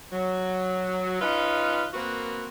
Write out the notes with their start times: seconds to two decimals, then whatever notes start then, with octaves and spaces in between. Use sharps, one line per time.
0.12 F#3
1.21 C#4 D#4 F4 B4
1.94 A#3 C4 F#4 A#4 B4